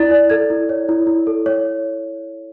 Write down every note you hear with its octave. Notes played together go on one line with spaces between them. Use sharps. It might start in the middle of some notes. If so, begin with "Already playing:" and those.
Already playing: E4 D5 A6
D5
A4 G#6
E4
C#5
E4
E4
A4
C#5